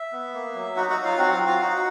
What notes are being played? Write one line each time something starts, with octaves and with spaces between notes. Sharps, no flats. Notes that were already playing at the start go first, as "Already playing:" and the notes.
Already playing: E5
B3
A#3
F#3
D#4 F#4 F#5
F#4 F#5
F#3
F4 F5
C4 F#4 F#5
F4 F5
F#4
F4 F5
D#4 F#4 F#5